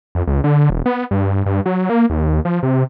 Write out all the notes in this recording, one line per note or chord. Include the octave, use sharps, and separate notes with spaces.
F2
C#2
D3
E1
B3
G2
G2
F#3
A#3
D#2
F3
C3